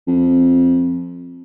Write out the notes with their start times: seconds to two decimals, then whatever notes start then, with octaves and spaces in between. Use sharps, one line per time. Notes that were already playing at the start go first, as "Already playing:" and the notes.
0.07 F2